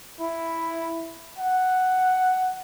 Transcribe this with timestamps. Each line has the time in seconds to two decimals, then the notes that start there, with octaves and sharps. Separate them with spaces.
0.20 E4
1.39 F#5